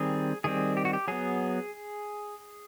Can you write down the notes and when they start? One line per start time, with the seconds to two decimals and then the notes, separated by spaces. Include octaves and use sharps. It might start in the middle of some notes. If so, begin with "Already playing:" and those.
Already playing: D#3 G3 C4 G#4
0.44 D#3 G3 C4 G#4
0.77 G4
0.85 F#4
0.93 G4
1.08 F#3 B3 G#4